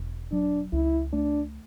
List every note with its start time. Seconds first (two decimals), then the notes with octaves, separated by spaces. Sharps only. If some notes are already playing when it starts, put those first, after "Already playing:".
Already playing: E1
0.32 F#3 D4
0.73 C#2 E4
1.13 A3 D4